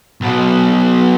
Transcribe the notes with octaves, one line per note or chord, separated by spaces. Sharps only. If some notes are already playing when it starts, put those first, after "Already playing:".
B1 B2